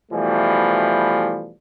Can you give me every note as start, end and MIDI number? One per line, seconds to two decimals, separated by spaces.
0.12 1.52 47
0.12 1.52 52
0.12 1.52 53
0.12 1.52 55
0.12 1.52 57